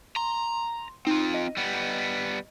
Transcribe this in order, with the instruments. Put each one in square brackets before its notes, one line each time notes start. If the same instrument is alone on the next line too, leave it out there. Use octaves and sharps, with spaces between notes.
[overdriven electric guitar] A#5 [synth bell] C6
[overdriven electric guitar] C4 F4 [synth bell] D#4
[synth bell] D#5
[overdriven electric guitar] G3 B3